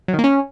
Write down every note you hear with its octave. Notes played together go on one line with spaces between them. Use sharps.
F#3
D#3
A#3
C#4